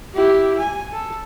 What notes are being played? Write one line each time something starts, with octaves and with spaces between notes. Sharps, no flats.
E4 G4
G#5
A4